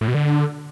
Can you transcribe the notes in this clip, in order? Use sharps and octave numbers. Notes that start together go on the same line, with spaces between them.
A2
B2
D3